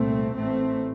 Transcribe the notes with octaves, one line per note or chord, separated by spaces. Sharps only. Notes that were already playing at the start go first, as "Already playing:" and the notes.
Already playing: C2 A#2 A3 C4
A1 A2 A3 C4